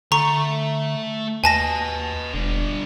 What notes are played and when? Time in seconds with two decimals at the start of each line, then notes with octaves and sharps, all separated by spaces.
0.12 D3 A3 A#5 C#6
1.44 D#2 B4 D#5 G#5 A5 A#6
2.34 E1 D3 G3